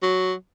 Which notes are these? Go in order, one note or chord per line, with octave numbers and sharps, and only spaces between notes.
F#3